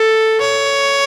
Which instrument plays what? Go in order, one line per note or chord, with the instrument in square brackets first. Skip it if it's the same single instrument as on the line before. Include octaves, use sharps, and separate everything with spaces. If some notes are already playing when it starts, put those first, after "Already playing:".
Already playing: [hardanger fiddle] A4
C#5